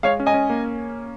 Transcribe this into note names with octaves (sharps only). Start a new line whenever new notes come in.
G#3 C#5 F5
C#4
D#5 G#5
C#4
A#3